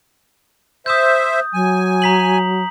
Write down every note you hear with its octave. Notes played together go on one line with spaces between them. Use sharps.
C5 E5 D#6 G6
F#3 G#5
A#5 B6 F#7